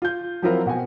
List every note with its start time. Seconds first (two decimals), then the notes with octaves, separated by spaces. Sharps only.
0.02 F4 G6
0.42 F3 F#3 C4 E4 F4 A#4
0.66 B2 F#4 G5 G#5